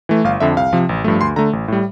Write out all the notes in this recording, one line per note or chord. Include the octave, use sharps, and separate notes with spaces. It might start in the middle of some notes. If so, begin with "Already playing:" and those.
E3 A3
G1 F5
F2 D3 E5
C2 F5
C3 F3
A1
G2 F3 A3
D2 C6
D3 A3 A#5
A1
A2 G3